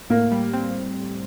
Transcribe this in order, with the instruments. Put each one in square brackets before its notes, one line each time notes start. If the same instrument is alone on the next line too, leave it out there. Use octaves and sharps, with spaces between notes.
[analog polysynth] A2 [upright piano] A#3
[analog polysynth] G3
C4